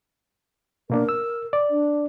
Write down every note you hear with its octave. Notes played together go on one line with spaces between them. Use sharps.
B2 A#3 D4 A#4
E6
D5
D4